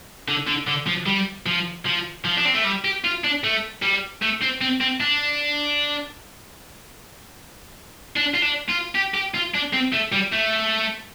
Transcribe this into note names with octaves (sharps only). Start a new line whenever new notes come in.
D3
D3
D3
F3
G3
F3
F3
F3
D4
C4
A3
G3
G4
F4
D4
A3
G3
A3
C4
C4
C4
D4
D4
F4
D4
F4
G4
G4
F4
D4
C4
A3
G3
A3